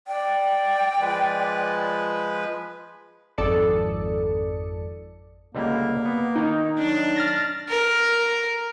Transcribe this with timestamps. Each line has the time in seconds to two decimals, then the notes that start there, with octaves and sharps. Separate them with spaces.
0.07 D5 G5
1.01 F3 G#3 B4
3.38 G#1 F2 A4 D5 D#6 C#7
5.55 C#2 D3 G3 A#3
6.05 B3
6.35 D#3 D#4 G5
6.79 F#3 D4
7.16 F6 A6 A#6
7.69 A#4